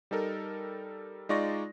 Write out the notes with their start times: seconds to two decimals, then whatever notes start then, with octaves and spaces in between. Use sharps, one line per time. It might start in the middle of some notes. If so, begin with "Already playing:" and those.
0.11 G3 D#4 A4 A#4
1.29 G#3 D#4 F4 D5 C#6 A#6